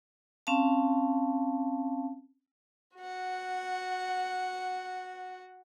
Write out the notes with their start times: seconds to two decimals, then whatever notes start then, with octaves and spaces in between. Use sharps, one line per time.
0.47 C4 C#4 F5 A5
2.97 F#4 F#5